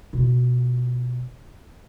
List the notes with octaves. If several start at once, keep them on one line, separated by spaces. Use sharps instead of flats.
B2 F4